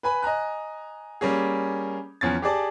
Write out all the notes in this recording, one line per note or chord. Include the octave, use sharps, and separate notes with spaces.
B4 G#5 B5
D#5 G#5 A#5 F#6
G3 A#3 C#4 G#4
E2 F3 C#4 G#6 A6
G4 G#4 D5 A5